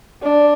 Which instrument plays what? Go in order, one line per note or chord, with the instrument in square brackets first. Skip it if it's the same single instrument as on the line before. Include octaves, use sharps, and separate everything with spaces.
[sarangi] D4